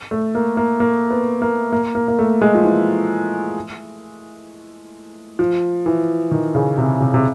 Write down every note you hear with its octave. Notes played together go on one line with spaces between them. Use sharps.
A3
A#3
A#3
A#3
B3
A#3
A#3
A#3
A#3
A3
G#3
F3
E3
F3
E3
D#3
C#3
C3
C3
C3